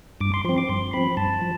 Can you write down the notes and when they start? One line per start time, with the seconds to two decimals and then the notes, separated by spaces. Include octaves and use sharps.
0.21 G2 D6
0.34 C6
0.45 F3 C4 C6
0.58 D6
0.69 G2 C6
0.93 F3 C4 B5
1.17 G2 A5
1.41 F3